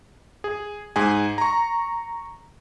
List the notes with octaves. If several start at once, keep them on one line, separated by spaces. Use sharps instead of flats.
G#4
G#2 G#4 G#5
A#5 C#6